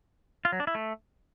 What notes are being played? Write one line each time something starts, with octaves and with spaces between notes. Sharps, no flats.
F4
F#3
D4
E4
A3